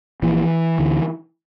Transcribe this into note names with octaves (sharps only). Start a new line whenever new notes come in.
A#1 A#2 E3
D2 D3